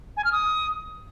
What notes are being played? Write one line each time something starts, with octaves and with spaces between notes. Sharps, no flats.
G#5
F6
D#6